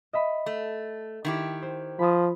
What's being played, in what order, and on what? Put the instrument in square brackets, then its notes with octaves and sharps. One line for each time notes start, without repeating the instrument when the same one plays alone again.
[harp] D#5 E5 B5
[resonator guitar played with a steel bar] A3
D#3 E4 G4
[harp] C5
[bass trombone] F3 [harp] B5 D#6